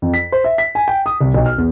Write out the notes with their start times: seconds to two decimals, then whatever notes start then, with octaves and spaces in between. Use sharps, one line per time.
0.02 F2
0.14 B6
0.32 C5
0.44 E5
0.58 B6
0.75 G#5
0.88 G5
1.06 D#6
1.21 C2
1.34 B1
1.46 F6
1.58 E2